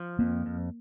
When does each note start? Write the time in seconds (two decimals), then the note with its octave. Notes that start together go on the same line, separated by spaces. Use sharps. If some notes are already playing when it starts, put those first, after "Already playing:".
Already playing: F3
0.19 F2 A#3
0.46 F2